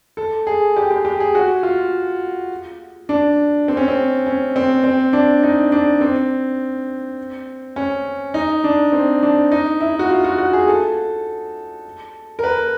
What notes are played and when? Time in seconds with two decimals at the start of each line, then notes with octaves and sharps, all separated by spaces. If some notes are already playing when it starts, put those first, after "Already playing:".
0.17 A4
0.47 G#4
0.77 G4
0.91 G4
1.05 G4
1.20 G#4
1.35 F#4
1.63 F4
3.09 D4
3.68 C4
3.77 C#4
3.88 C4
4.27 C#4
4.56 C4
4.84 C4
5.13 D4
5.43 D#4
5.72 D4
6.01 C4
7.76 C#4
8.34 D#4
8.64 D4
8.92 C4
9.23 D4
9.52 D#4
9.80 E4
9.99 F#4
10.09 F4
10.24 F#4
10.38 F#4
10.53 G#4
10.68 A4
12.39 A#4
12.44 B4